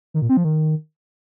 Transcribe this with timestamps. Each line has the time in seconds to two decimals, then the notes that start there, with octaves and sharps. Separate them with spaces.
0.14 D#3
0.22 A#2
0.29 C4
0.37 F3
0.45 D#3